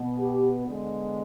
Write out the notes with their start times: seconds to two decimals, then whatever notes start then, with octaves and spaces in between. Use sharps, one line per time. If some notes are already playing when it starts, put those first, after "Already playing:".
Already playing: B2 B3
0.17 G4
0.67 D3 G#3 B3